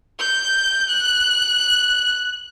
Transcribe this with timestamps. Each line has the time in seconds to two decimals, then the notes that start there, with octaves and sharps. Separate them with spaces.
0.20 G6
0.89 F#6